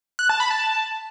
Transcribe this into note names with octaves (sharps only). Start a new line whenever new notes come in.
F#6
A5
B5
A5